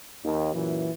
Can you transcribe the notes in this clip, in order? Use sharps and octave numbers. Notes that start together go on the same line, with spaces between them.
D#2
F#2 A#2 E3